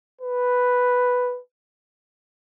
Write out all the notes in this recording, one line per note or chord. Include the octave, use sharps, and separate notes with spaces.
B4